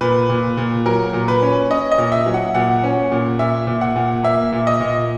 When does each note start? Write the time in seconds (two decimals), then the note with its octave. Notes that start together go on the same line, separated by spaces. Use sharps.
0.01 A#2 B4
0.30 A#2
0.57 A#2
0.86 F#3 A#4
1.13 A#2
1.28 B4
1.42 C#4
1.70 C#4 D#5
1.92 D#5
1.98 A#2
2.12 E5
2.26 F#3
2.34 F#5
2.55 A#2 F#5
2.84 C#4
3.12 A#2
3.39 A#2 E5
3.67 A#2
3.81 F#5
3.96 A#2
4.23 A#3 E5
4.53 A#2
4.67 D#5
4.80 A#2